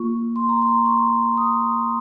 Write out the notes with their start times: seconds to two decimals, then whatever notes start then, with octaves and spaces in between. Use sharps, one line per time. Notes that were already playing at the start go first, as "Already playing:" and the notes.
Already playing: A#3 F4 C#6
0.36 C6
0.49 A#5
0.62 C6
0.86 C#6
1.37 D#6